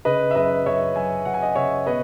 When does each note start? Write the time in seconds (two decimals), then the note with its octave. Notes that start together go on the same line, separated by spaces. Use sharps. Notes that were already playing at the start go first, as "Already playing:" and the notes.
0.05 C#3 B4 D#5
0.31 E5
0.35 F#2 B4 D#5
0.66 F#2 C#5 E5
0.96 F#3 E5 G#5
1.25 F#2 F#5
1.34 G#5
1.42 D#5 F#5
1.56 C#3 C#5 E5
1.86 B2 B4 D#5